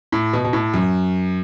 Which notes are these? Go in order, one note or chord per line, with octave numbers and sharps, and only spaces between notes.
A2
B2
B2
A2
F#2